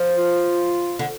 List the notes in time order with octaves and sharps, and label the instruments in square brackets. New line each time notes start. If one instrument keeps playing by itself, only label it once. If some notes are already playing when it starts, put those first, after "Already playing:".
Already playing: [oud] F3
[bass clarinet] F4
[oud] D3